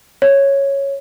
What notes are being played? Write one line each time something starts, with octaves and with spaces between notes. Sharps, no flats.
C#5